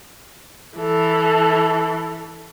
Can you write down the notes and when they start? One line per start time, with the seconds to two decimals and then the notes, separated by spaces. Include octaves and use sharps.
0.78 E3 A4